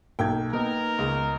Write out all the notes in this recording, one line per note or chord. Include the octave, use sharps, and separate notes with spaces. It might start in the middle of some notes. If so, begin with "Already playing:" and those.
B1 A#3 G5 G#6
A#3 B3 D#4 A#4
C#2 G#3